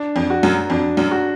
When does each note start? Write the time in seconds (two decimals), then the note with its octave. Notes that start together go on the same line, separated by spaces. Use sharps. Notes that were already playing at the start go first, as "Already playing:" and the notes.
Already playing: D4
0.16 F2
0.30 F#4
0.43 F#2
0.70 F2 D4
0.97 F#2
1.11 F#4